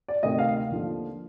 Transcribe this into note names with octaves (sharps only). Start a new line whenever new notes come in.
D5
D2 C3 D#3 D#5
F5
D#2 D3 F3